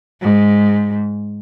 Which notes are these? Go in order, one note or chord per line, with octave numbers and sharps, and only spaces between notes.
G#2